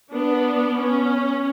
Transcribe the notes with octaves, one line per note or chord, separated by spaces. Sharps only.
B3 D4
C#4